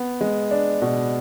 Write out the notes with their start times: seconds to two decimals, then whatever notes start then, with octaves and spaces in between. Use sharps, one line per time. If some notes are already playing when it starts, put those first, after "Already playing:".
Already playing: B3
0.21 G#3
0.51 D4
0.82 B2